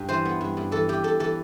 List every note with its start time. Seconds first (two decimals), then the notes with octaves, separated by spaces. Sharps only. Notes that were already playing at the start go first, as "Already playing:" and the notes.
Already playing: G2
0.09 E3 C5
0.25 B3
0.41 G2
0.57 G2
0.72 E3 A4
0.89 E3 G4
1.03 G2 A4
1.20 E3 A4